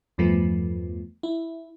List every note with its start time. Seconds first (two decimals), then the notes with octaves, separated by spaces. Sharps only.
0.18 E2 G2 F3 A3 B3
1.23 E4